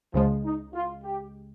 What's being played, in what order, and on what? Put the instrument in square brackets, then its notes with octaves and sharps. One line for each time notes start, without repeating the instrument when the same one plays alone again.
[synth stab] C#2 C#3 G#3 [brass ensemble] F3
[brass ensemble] D#4
F4
G4